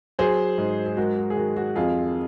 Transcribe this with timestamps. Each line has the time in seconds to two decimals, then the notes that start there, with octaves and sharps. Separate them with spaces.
0.19 F#3 G#4 C5
0.58 G#2
0.86 G#4
0.97 G#3 F#4 A#4
1.18 F#4
1.30 G#4
1.36 D#3 F#4
1.56 F#4
1.76 F2 F4 G#4